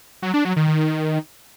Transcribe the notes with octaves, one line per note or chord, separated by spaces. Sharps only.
F#3
D4
F#3
D#3
D#3